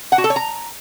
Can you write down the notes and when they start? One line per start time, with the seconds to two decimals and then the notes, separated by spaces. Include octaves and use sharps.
0.12 F#5
0.18 F#4
0.24 A4
0.30 C#5
0.36 A#5